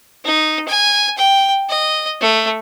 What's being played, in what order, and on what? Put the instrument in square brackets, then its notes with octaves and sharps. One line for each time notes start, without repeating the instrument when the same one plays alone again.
[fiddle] D#4
G#5
G5
D#5
A3